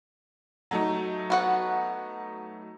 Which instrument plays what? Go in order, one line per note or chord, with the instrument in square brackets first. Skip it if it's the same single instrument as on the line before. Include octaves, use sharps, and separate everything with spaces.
[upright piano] F#3 A3 D#4
[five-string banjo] B3 F#4 F#5